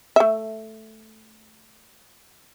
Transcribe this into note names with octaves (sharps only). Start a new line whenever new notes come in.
A3 E5